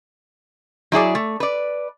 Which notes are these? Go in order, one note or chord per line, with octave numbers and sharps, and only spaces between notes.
F#3 E4 G#4 D5
A3
B4 D5